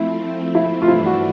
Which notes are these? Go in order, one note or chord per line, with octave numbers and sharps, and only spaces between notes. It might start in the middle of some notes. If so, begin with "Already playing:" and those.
Already playing: F3 A3 C4 E4
E4
F4
G2 E3 A3 D4 E4
F#4